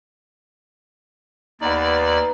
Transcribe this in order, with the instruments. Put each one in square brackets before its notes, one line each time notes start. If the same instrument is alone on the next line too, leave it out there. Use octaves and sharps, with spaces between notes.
[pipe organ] D#2 D5 [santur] B3 D#4